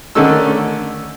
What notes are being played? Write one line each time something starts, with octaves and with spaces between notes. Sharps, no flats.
D3 D#3 A3 C#4 A4 E6